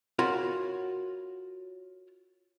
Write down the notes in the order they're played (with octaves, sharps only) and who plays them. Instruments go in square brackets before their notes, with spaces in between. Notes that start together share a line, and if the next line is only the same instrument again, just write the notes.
[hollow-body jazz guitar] F4 F#4 A#4 C#5 B5